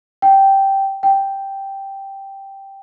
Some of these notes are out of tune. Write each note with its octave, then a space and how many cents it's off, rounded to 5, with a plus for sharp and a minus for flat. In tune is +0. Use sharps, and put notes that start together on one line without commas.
G5 -5
G5 +0